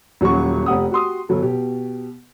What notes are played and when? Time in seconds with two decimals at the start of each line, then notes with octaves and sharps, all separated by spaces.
0.21 D#1 F#3 C#4 F#4 C#6
0.66 F1 G4 F#5 D#6
0.91 F#4 G4 C6 D#6
1.29 G1 F#3 A4
1.42 B2 G4